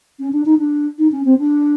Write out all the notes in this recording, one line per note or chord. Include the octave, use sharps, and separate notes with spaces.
C#4
D4
D#4
D4
D#4
C#4
C4
D4